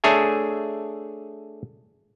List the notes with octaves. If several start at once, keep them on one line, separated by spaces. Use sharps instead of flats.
A3 D4 G#4 C#5 E5 G#5